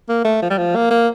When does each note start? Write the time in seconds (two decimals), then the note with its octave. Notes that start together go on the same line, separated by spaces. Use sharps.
0.09 A#3
0.25 A3
0.42 F3
0.50 G3
0.58 F3
0.75 A#3
0.91 A#3